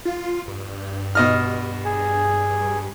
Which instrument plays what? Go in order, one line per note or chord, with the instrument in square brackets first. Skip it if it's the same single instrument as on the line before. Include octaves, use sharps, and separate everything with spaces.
[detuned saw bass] F4
G2
[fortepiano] B2 D#5 F6
[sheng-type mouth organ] G#4